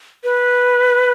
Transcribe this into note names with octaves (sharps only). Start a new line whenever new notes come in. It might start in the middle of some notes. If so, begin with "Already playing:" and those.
B4